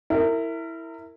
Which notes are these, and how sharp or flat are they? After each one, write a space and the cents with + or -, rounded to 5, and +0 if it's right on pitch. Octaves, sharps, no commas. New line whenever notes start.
E4 +0 A#4 -30